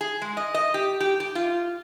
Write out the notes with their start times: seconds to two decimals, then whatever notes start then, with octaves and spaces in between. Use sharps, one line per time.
0.01 G#4
0.22 G#3
0.37 D#5
0.54 D#5
0.74 G4
1.00 G4
1.20 G4
1.35 F4